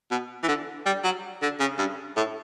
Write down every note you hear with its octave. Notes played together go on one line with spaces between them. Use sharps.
B2
E3
D3
G3
F#3
D3
C#3
G2
A2